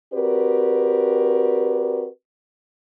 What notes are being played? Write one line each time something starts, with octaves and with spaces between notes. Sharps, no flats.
C4 F#4 G4 A#4 B4 D5